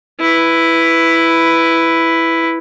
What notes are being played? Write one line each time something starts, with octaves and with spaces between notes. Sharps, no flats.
E4 B4